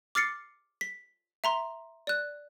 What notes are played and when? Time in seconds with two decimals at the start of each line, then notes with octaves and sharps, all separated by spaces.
0.15 D6 F6 A6 C7 C#7
0.81 B6
1.44 E5 A#5 C6
2.07 D5 F#6